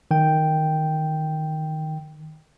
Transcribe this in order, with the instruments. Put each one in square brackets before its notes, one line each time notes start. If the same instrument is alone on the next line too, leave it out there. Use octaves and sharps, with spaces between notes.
[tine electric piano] D#3 G5